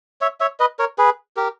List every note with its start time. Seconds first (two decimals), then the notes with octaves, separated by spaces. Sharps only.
0.21 C#5 E5
0.40 C#5 E5
0.60 B4 D#5
0.79 A#4 C#5
0.98 G#4 B4
1.37 G4 A#4